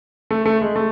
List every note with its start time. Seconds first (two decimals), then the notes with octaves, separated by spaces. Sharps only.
0.31 A3
0.46 A3
0.61 G#3
0.76 A3